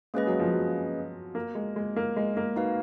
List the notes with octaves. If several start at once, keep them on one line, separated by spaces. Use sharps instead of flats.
G#3 A#3 C#4 G#4 B4 D#5
F#3
F3
F#3
A#3
G#3
G#3
A#3
G#3
A#3
D#4 F#4 B4 F5